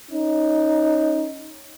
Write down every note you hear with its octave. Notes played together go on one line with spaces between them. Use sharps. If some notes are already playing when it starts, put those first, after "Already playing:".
C#4 D#4